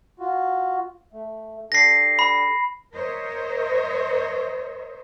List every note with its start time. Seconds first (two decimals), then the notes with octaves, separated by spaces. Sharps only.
0.20 F4 F#4
1.13 A3
1.72 D4 G4 A4 A#6 C7
2.19 B5
2.93 A#4 C5 C#5 D#5 E5